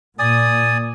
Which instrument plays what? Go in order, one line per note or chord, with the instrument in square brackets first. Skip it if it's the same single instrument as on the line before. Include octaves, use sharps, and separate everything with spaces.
[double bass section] A#2 [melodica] D5 G#5 D#6